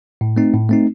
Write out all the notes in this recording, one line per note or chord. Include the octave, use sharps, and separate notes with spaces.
A2
A3 C4 D#4
A2
A3 C4 D#4